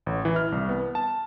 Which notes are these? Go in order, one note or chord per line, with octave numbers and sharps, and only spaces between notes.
A1
E3
F6
C2
B3
A5